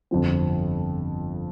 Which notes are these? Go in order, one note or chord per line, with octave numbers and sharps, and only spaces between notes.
G1 F2 F3 C4